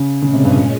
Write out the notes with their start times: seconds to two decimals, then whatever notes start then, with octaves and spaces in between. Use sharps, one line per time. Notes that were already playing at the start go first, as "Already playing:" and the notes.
Already playing: C#3
0.22 A#2 C#3 G#3 C#4
0.33 C3
0.45 G2